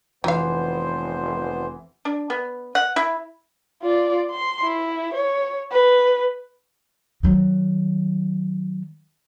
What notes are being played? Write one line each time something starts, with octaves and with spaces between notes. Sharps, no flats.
F1 E3 F#3 B3 C5 F5
D4
B3
F#5
E4
F4 D5
C6
E4
C#5
B4
D#3 F#3